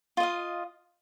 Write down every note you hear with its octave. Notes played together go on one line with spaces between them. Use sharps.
F4 D#5 F5